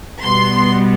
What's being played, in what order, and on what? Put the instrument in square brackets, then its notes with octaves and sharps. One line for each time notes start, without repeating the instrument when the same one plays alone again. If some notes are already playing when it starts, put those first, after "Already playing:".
[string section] B2 G3 B3 C6